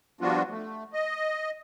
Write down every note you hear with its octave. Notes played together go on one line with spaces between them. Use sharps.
F3 G3 B3 D4 F4 F#4
A3
D#5